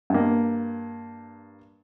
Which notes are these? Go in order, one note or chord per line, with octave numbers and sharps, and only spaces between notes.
G2 A#3